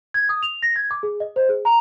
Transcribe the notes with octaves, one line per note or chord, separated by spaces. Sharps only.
G#6
D#6
F7
A#6
G#6
D6
G#4
D#5
C5
G#4
A#5